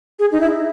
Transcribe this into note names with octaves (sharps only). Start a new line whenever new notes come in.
G#4
D#4
E4